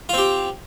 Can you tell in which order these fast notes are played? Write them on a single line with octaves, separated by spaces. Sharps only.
F4 C4 G4